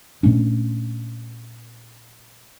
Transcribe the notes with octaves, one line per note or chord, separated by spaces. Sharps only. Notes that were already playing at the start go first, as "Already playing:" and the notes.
A#2 A3 C#4 D4